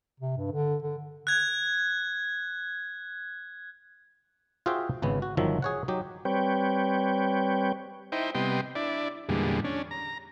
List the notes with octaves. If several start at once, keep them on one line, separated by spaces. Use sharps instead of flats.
C3
G2
D3
D3
F#6 G#6
F4 F#4 G#4 C5 E5 G5
G#1 C#3 B3
F#4
G1 D#3 F3 F#3 E5
G#4 C#5 F#5
F#3 D#4 G4
G3 C4 B4 C#5 G5
D#4 E4 C5 G5
C3 G3 B3 D#5 G5 C6
D4 E4 D5
E2 A#2 D3 G3 G#3
C#4 D4
A#5